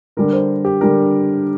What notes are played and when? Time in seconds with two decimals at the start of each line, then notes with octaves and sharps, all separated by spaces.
0.17 D3 G3 D4 A#4
0.33 C5
0.65 G4
0.81 D3 G3 D4 A#4